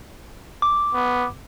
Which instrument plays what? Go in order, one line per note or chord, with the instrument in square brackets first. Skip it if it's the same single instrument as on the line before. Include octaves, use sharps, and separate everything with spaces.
[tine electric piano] D6
[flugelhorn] B3